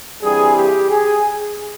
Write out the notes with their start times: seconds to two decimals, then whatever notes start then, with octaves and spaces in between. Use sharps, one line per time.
0.22 G2 E3 G3 C4 G#4
0.55 G4
0.89 G#4